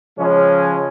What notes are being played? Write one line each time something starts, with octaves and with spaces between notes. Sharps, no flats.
C#3 F3 G#3 C#4